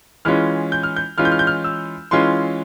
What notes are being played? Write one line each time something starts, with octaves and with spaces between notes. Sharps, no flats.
E3 G#3 C#4 F4 F6
G6
F6
G6
E3 G#3 C#4 F4 F6
G6
F6
G6
F6
E6
E3 G#3 C#4 F4 C6